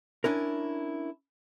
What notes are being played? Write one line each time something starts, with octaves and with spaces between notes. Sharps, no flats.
C#4 D4 E4 A#4